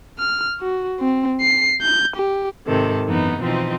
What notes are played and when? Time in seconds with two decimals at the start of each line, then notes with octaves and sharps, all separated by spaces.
0.19 F6
0.61 F#4
1.00 C4
1.42 C7
1.82 G6
2.17 G4
2.66 G#2 C3 D#3 A4
3.07 F#2 E3 B3 D#4
3.40 B2 E3 F3 C4 D#4